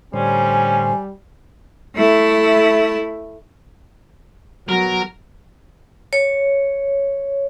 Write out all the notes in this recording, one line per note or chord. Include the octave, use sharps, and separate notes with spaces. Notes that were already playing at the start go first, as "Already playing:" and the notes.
A2 D3 G3 C#4 C5 G#5
A3 E4
F#3 B3 A#4
C#5